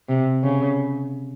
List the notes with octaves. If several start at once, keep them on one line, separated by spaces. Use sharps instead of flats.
C3
C#3